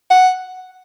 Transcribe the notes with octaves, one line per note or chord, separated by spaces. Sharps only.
F#5